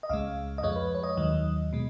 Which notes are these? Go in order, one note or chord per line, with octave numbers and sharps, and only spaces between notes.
D#5
C#2 C#3 G#3 F5
D#5
F2 F3 G#3 C#5
B4
C#5
D#5
D#2 D#3 F#3 D#5
B2 G#3